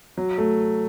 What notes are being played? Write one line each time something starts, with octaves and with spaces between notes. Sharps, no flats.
F#3
A3